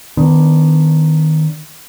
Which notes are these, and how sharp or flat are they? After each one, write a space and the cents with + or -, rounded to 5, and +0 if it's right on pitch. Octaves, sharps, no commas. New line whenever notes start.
D#3 +0 B3 +25 D4 +0